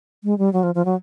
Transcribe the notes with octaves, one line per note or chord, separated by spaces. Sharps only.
G#3
G3
F#3
F3
F3
F#3